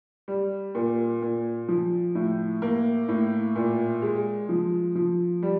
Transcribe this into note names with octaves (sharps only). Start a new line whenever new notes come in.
G3
A#2
A#2
F3
A2
A#3
A2
A#2
G#3
F3
F3
G3